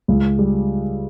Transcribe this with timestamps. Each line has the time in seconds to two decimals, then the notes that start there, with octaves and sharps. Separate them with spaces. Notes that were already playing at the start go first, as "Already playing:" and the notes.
0.08 C#2
0.39 G3